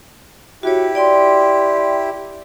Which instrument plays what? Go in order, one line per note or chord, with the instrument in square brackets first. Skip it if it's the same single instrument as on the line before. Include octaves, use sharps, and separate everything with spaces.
[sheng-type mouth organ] E4 G4 [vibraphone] F#4 C#5
[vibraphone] D5 G5 C6